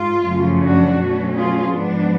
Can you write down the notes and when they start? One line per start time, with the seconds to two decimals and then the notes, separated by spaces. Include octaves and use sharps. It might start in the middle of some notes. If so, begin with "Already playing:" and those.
Already playing: G#2 F4
0.25 F#2 C#3 F3 A3 C#4
0.62 D4 F#4
0.99 B2 F#3 A3 C#4
1.37 F4 G#4
1.74 G#2 F3 B3 D4